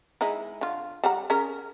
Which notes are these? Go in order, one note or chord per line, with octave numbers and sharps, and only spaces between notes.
G#3 D#4 E4
D3 F4
G3 F#5 A#5
C#4 G#4 A#4